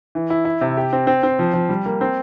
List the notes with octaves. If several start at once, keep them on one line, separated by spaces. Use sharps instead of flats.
E3
E4
E4
C3
G4
C4
C4
C4
F3
F3
G3
A#3
C4